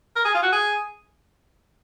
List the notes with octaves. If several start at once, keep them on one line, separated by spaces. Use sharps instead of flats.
A#4
G#4
F4
F#4
G#4